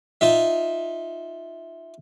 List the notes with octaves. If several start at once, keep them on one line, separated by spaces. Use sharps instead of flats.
D#4 F4 E5